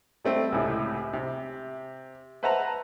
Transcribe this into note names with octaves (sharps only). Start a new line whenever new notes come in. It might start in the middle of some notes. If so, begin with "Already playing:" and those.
G3 A3 C4
C#2 A2 C3
C3
B4 C5 E5 F#5 A5 A#5